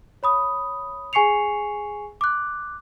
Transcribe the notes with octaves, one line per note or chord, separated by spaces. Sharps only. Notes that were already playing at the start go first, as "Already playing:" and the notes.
C#5 B5 D#6
G#4 G#5 C#6 C7 C#7 F7
D6 F#6